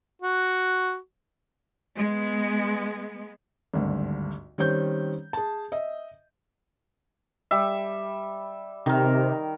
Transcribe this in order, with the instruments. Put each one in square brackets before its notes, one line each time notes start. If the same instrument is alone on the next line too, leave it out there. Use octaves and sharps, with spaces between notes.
[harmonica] F#4
[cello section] G#3 B3
[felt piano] G#1 D2 G2
D#3 G3 C4 C#4 G6
G#4 A5
D#5 E5
[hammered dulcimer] G3 E5
[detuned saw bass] C3 [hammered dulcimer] D#3 A#4